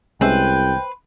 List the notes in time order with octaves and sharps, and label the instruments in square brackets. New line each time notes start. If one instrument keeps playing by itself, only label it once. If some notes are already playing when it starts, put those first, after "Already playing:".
[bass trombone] C2 [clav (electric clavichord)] G#3 C#4 E5 [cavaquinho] B4 C5 [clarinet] G5